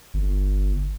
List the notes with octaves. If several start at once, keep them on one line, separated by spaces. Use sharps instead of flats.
G1